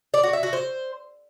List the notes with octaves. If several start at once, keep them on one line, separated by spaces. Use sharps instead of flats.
D5
F#4
E5
F#4
C5